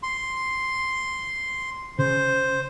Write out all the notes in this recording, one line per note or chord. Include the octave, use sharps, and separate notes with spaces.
C6
C#3 C5